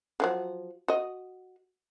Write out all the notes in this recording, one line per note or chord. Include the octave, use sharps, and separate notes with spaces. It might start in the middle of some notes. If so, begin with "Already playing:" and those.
D3 F3 F#3
F#4 D#5